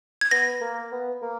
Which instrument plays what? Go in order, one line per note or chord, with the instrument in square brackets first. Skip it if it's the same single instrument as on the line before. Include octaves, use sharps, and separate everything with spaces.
[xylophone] G#6
[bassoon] B3 [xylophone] A#6
[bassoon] A#3
B3
A#3